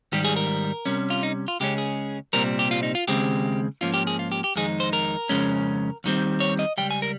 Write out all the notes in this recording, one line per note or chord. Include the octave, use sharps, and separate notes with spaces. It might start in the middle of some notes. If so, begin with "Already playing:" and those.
G#2 D#3 G3 G4
G#4
A#4
C3 G3 C#4
F4
D#4
F4
C#2 C#3 G#3 C#4 G4
G#4
C2 A#2 G3 C4 A#4
G4
F4
D#4
F4
D#2 C#3 G#3 C4 G4
G#2 F3 A#3 C#4 F4
G4
G#4
F4
G4
G4
F2 D#3 G#3 D#4 G#4
C5
A#4
F2 C#3 G#3 C#4
D#2 D#3 G3 C4
C#5
D#5
C#2 C#3 G3 G5
G#5
A#4